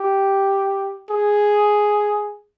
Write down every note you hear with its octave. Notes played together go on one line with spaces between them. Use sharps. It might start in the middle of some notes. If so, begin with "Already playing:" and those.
Already playing: G4
G#4